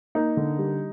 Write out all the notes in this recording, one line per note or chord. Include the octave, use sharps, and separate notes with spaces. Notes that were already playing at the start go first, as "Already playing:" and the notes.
A#3 D#4
D3
G3